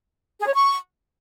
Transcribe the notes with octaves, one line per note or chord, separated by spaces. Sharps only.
G#4
C#5
C#6